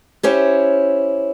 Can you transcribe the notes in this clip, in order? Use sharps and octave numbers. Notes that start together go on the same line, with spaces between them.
C#4 E4 G4 C5 C#5